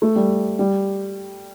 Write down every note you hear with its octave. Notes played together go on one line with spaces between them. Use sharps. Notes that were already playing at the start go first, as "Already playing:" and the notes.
A3
G3
G3